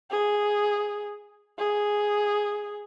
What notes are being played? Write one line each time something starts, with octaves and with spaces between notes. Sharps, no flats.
G#4
G#4